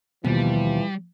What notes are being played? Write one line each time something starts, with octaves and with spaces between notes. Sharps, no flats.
D#2 B2 E3 F3 G3